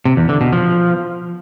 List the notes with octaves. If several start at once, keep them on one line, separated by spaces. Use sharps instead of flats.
C3
E2
D3
B2
F3